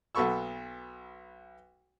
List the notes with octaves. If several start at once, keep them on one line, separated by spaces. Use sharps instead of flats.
B1 B3 A4 B5 C#6 E6